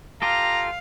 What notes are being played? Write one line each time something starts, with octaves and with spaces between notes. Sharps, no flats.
F4 G4 A4 F5 A#5